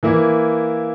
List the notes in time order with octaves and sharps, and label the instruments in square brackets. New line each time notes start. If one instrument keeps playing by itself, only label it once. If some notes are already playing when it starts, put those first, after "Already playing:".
[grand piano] E3 A#3 E4